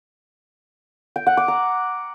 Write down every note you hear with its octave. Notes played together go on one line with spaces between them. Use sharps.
G5
F#5
D6
A#5